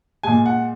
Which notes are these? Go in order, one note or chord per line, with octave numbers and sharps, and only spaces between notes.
A#2 G#3 G#5
F#5